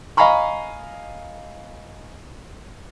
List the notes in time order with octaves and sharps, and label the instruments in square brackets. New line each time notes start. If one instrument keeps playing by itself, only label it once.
[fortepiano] D#5 F5 G#5 A#5 B5 C#6